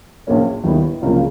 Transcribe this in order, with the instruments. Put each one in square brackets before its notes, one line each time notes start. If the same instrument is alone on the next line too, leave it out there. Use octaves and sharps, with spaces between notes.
[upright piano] A#1 A#2 F3 A#3 C#4
D#2 D#3 G3 B3 E4
C#2 C#3 F3 A#3